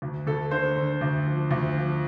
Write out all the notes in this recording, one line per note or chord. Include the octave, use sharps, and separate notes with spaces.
D2
D2 A4
D3 C5
D3
D2
F3
D2
F3